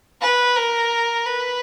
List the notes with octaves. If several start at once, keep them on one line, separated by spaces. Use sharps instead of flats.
B4
A#4
B4